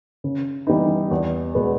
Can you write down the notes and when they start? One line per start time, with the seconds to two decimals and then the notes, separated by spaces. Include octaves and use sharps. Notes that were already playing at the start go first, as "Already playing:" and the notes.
0.24 C#3
0.67 E3 G3 B3 D#4
1.11 E2
1.55 B2 G#3 B3